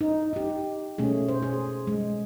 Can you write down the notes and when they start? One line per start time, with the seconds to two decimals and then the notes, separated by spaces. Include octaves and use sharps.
0.01 D#4
0.33 D#4 G4
0.98 B2 A3 C#4 G#4
1.28 C5
1.43 G#4
1.87 G#3